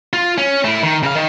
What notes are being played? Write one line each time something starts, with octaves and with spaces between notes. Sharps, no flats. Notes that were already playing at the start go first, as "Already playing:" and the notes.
F4
C#4
A3 E4
D#3
C#3 F5
D#3